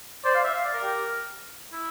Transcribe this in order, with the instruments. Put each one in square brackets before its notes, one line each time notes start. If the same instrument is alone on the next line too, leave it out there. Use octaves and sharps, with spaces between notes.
[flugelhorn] C5 [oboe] D5
[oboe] F5
E5
F5
D5
A#4
[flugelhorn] G4
[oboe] E4